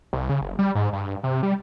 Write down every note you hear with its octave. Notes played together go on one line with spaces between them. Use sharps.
C2
C#3
F#1
G3
G#2
G2
C3
G3